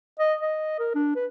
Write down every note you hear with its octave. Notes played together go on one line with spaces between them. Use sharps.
D#5
D#5
A#4
D4
B4